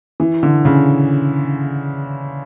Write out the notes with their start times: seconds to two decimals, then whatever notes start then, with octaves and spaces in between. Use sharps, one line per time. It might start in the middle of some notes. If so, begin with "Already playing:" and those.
0.20 E3
0.43 D3
0.65 C#3